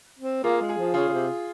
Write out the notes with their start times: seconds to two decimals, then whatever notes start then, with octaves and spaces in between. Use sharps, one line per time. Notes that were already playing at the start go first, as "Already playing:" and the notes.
0.19 C4
0.44 A#3 F4 G#4
0.62 G#3
0.69 G#4
0.78 F3
0.94 C#3 F4 G#4
1.08 C#3
1.12 C3